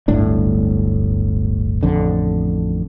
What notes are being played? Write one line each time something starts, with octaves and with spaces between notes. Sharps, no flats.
D1 G1 A2 D4
A1 F2 D3